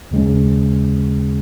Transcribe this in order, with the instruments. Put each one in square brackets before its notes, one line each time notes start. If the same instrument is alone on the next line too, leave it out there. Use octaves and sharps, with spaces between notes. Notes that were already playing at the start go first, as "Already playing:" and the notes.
[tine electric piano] D#2 C#3 G#3 C#4